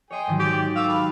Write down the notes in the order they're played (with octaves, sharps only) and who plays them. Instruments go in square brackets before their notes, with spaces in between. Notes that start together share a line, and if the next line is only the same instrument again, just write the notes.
[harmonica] G#4 G5 [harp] C#5 D#5 C6
[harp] G#2 D#3 F#3
[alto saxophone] G4 [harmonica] D5
[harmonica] A3 D6 E6 [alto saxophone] F5
[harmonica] G3 B4 [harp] A5